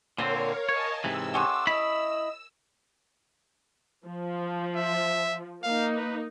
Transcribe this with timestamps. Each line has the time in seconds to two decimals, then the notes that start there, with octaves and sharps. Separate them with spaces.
0.18 A#2 D3 C4 A#4 C5 C#5 F5
0.69 C#5 D#5 G#5 A5
1.04 G#2 C3 E3 E6
1.34 A3 C#4 G4 F#5 C6 D6
1.67 E4 D#5 B5
4.06 F3
4.76 E5
5.63 A#3 D#4 F5
5.96 B4